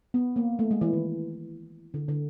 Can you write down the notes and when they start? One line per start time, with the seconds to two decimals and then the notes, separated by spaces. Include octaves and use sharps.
0.14 B3
0.36 A#3
0.59 A3
0.71 G#3
0.81 E3
0.93 D#3
1.94 D3
2.09 D3